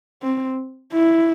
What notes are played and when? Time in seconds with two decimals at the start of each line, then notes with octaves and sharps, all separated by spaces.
0.22 C4
0.93 E4